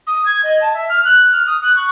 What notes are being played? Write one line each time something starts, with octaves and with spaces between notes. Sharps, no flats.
D#6
G#6
D#5
A5
E5
F6
F#6
F6
D#6
F#6
C#6